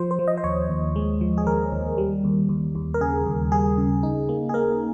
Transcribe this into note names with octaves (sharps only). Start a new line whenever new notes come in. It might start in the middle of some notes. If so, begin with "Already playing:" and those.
Already playing: F3 C5
C5
F3
D#5
C5
D#2 C#5
D#2
G#3
F3
G#4
D#2 A#4
D#2
G3
D#2
D#2
D#2
A#4
C#3 G#4
D#2
G3 G#4
C#3
D#4
A#3
G#4
A#3 A#4